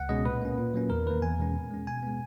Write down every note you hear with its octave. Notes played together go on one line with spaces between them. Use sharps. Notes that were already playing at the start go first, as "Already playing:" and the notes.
Already playing: C#2 F#5
B2 G#3 C#4 D#5
A#2 B4
A#3 C#4
A#2
F#3 A#3 C#4
E2 A#4
D#3 A#3 B4
E2 G#5
B2 G#3 C#4
A#2
G#3 C#4
B2 G#5
G#3 B3